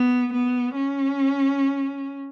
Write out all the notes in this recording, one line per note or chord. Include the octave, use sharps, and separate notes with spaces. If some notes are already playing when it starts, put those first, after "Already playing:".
Already playing: B3
B3
C#4